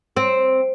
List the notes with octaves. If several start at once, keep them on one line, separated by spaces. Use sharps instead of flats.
C4